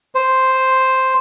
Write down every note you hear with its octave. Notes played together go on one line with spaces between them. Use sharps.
C5